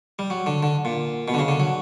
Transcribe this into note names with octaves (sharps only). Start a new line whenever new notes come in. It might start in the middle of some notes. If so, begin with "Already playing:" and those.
G3
F#3
D3
D3
A#2
B2
D3
C#3
D3
F#3